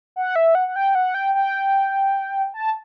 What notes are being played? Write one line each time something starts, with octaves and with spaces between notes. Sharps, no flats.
F#5
E5
F#5
F#5
G5
F#5
G5
G5
A5